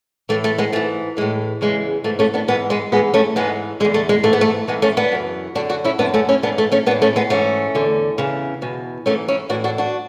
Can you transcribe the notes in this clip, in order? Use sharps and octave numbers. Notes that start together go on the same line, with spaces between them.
A2 E3 A3
A3
G#3 B3
G#2 E3 A3
A2 E3 G#3
E2 C#3 E3 G#3
G#2 E3 A3
A3 C#4
B3 D4
G#2 E3 G#3 B3
G#3 B3
G#2 E3 G#3 B3
A3 C#4
G#2 E3 G#3 B3
E2 D3 G#3
A3
G#3
G#2 E3 A3
B3
A3
G#2 E3 G#3 B3
A3 C#4
B3 D4
F#2 C#3 E3
F#2 D3 D4 F#4
D4 F#4
C#4 E4
F#2 D3 B3 D4
A3 C#4
C#4 E4
G#2 E3 B3 D4
A3
A3 C#4
A2 E3 B3 D4
A3 C#4
G#3 B3
G#2 E3 A3 C#4
E2 D3
E2 C#3 E3
E2 B2
G#2 E3 A3 C#4
C#4 E4
A2 E3 D4 F#4
D4 F#4
D4 F#4